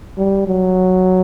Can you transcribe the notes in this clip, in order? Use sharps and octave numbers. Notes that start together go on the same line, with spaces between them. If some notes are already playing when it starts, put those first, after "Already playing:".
G3
F#3